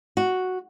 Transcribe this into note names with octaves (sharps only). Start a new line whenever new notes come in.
F#4